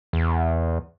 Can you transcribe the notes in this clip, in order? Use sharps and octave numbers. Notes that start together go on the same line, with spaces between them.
E2